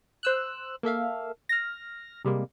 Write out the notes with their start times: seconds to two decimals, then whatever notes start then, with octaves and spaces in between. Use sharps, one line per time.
0.23 C5 E6 F#6
0.83 A#3 A4 E5 F5
1.49 F6 A#6
2.25 C3 G3 G#3 A#3